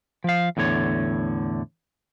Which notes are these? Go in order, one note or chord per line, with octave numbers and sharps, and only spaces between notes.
F3 F5
E2 A2 D3 C#5